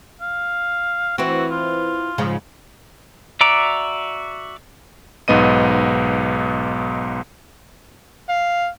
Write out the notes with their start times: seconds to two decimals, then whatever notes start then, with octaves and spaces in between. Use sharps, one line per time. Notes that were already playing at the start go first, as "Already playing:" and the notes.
0.21 F5
1.18 E3 C4 F#4
1.51 F4
2.18 G#2 C#3 F3
3.41 F#4 D5 E5 A#5 D6
5.28 B1 G#2 B3 D#5 D#7
8.29 F5